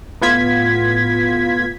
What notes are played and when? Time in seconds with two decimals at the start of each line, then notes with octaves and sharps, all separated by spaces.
0.21 A2 B3 F4 G#6 B6